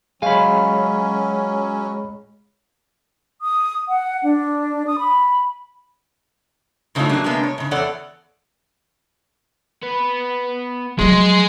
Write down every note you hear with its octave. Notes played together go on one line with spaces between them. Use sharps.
F#3 G#3 C#4 C#5 F5 G#5 B5
D#6
F#5
D4
D#6
B5
G#2 C#3 A3 D4 D#4 F4
F#3 G3 A#3 D4
C3 G#3 A#3 B3 D4
C#5
G#2 C#3
E2 A4 C#5 D5 F#5
B3 B4
F3 F#3 G#3 C6